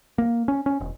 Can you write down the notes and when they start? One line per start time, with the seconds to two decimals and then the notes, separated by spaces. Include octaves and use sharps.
0.18 A#3
0.48 C#4
0.66 C#4
0.80 E1